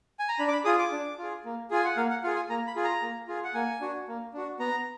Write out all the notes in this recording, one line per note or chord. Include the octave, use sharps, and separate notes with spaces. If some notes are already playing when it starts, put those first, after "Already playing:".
G#5
A#5
D4 B5
D6
B5
F4 G#4 D#6
D6
D4
F4 G#4
A#3
F4 G#4 G#5
F#5
A#3 F5
F#5
F4 G#4 F5
G#5
A#3 A#5
B5
F4 G#4
A#5
A#3
F4 G#4
F#5
A#3 G#5
D4 F#4
A#3
D4 F#4
B3 A#5